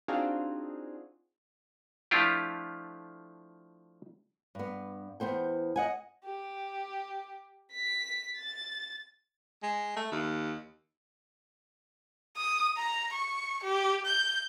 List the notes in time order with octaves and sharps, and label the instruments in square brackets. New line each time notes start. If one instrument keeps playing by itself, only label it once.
[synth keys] C4 D4 D#4 F4 F#4 G#4
[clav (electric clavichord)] F3 A3 D4 E4 F4 G4
[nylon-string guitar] G2 B3
E2 B3 C5 G5
D#5 F#5 G#5
[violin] G4
B6
A6
[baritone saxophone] G#3
A3
D#2
[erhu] D#6
A#5
C#6
G4
G6